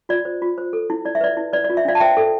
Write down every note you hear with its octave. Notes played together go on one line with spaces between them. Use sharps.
F4 D5
C5
F4
C5
A4
E4
E4 D5
E5
B4 D5
E4
B4 D5
D5
F4
E5
D4 D5 F5
A5
C5 E5 G5
A4